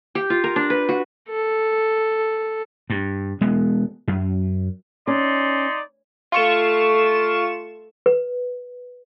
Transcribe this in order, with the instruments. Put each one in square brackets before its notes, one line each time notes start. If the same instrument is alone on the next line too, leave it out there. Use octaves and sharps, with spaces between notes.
[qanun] G4
F4
A#4
D4
B4
F#4
[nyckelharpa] A4
[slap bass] G2
E1 G#3 B3
F#2
[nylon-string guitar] C#4 [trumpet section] D#4 D5 C6
[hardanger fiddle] A3 [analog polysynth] F4 C#6 E7
[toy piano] B4